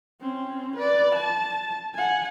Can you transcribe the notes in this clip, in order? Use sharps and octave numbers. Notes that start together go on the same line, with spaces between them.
C4 C#4
B4 D5
A5
F#5 G#5